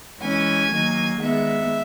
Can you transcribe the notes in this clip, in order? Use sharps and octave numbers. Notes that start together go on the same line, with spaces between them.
E3 G#3 C#4 G#5
D#3 F#3 A#3
D#3 G#3 B3 E5